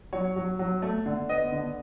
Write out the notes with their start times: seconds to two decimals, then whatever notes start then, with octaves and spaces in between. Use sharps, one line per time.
0.13 F#3 C#5
0.36 F#3
0.59 F#3
0.82 A3
1.06 D3
1.29 B3 D#5
1.52 D3